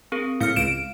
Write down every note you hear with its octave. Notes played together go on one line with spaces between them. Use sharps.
C4 G#4 A#4
A2 F5 F6 C#7
C#2 D7 E7